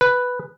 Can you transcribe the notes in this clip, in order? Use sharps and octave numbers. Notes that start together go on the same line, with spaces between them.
B4